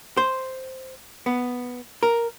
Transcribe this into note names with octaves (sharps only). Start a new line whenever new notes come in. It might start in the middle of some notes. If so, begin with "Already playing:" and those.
C5
B3
A#4